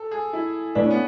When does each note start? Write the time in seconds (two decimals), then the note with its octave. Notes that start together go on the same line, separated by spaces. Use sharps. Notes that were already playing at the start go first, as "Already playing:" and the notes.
Already playing: A4
0.11 G#4
0.33 E4
0.75 B2 A3 D4 E4 B4 D5
0.83 C#4
0.90 B3